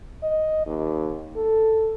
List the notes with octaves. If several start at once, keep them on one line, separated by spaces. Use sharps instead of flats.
D#5
D#2
A4